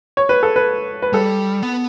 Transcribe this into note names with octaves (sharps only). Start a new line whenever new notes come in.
C#5
B4
A4
B4
B4
G3 A4
B3